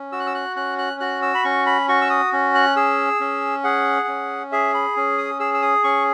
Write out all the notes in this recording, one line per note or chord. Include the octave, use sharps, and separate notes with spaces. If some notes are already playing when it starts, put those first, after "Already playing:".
Already playing: C#4
F#4 E6
F#6
E6
F#6
C#4 F#6
F#6
F#4 F#6
E6
B5
C#4 C#6
B5
F#4 C#6
E6
D#6
C#4
F#6
G#4 E6
C#4
G#4 F#5
C#4
G#4 E5
B5
C#4
D#6
G#4 E6
E6
D#6
C#4 C#6